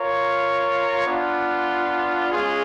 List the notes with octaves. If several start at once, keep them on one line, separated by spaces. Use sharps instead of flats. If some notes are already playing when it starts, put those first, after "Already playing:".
Already playing: F4 A#4 C#5
B3 D4 F4
G#3 C#4 F4 G#4